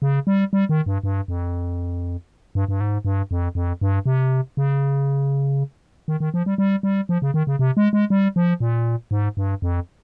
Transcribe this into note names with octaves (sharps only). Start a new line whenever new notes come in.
C#3
G3
G3
D#3
G2
G2
F2
G2
G2
G#2
G2
F2
F2
G2
C3
C#3
D#3
D#3
F3
G3
G3
G3
F3
C#3
D#3
C#3
C3
G#3
G#3
G3
F3
A#2
G#2
G2
F2